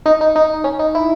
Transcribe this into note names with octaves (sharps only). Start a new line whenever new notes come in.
D#4
D#4
D#4
C#4
D#4
E4